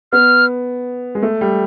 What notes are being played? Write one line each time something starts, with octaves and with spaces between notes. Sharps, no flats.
B3 F6
G#3
A3
G3